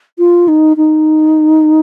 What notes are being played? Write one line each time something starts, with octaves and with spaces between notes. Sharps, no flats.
F4
D#4
D#4